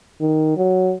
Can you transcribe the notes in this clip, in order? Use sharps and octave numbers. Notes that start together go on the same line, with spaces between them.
D#3
F#3